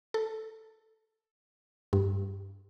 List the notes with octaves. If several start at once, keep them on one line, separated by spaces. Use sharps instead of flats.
A4
G2